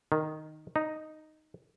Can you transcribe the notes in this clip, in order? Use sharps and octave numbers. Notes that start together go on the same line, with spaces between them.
D#3
D#4